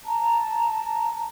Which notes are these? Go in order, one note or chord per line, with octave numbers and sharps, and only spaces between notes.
A5 A#5